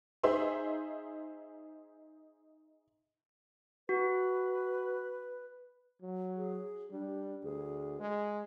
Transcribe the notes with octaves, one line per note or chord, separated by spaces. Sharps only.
D#4 G#4 C5 E5 C6
F#4 B4
F#3
G#4
G3 D4
D2 G#4
G#3